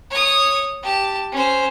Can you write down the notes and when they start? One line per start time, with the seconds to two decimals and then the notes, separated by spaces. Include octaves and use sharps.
0.11 C#5 D#6
0.83 G4 A5
1.32 C#4 C5